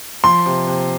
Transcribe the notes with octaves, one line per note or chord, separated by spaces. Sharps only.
F3 C6
C3
C3